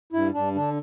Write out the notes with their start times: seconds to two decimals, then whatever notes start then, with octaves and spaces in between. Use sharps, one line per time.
0.13 G2 E4
0.34 G2 D4
0.55 D3 D4